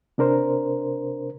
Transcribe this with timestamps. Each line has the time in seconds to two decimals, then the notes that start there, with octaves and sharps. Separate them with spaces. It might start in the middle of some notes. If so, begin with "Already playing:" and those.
0.18 C3 D4 A#4 C5